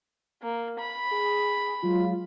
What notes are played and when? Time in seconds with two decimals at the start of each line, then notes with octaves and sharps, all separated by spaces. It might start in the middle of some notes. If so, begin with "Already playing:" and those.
0.42 A#3
0.79 B5
1.11 G#4
1.83 F#3 G#3 F4